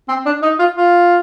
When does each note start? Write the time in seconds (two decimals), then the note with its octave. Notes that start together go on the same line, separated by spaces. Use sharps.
0.09 C4
0.26 D4
0.42 D#4
0.59 F4
0.76 F4